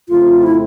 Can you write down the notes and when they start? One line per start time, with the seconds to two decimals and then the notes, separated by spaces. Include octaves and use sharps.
0.09 F2 C#3 F3 A3 C4 F4
0.43 E4